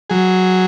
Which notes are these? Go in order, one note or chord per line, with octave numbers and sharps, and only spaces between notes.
F#3 G#4